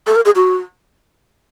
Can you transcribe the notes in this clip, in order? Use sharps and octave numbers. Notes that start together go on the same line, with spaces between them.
A4
A#4
G#4
F#4